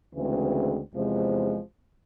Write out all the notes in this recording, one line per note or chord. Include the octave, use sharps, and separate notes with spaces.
D2 C#3 E3 G#3 C4
E2 C3 F3 G#3